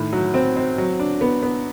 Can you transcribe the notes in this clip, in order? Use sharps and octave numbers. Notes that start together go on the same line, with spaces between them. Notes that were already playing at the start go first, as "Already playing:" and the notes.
Already playing: A2 D#3
F#3
C4
C4
F#3
D4
B3
B3